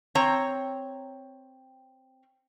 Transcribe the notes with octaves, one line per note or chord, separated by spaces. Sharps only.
C4 C#5 A#5